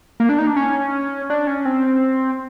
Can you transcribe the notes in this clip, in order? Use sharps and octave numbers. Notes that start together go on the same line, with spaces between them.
A#3
D4
D#4
D4
C#4
D4
C#4
C4